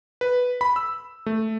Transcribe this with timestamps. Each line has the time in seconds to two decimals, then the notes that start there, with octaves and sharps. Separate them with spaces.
0.21 B4
0.61 B5
0.76 E6
1.26 A3